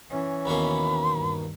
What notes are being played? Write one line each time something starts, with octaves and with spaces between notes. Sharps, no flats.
E3 C#4
D#2 B2 A#3 B5
G2